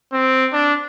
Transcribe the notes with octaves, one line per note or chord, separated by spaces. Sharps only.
C4
D4